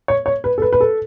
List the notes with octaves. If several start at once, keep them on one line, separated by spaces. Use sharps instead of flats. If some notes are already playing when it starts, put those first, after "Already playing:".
C#5
C#5
B4
A4
B4
B4
A4